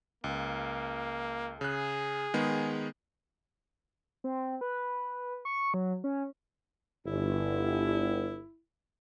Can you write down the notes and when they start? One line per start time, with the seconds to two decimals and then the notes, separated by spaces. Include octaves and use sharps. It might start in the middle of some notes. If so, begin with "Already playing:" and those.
0.24 C#2 A#3
1.61 C#3 G#4 F#6
2.34 D#3 G#3 B3
4.24 C4
4.61 B4
5.45 C#6
5.74 F#3
6.04 C#4
7.06 G1 E4